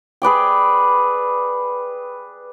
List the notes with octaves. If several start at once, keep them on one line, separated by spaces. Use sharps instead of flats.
G#4 B4 D5 G5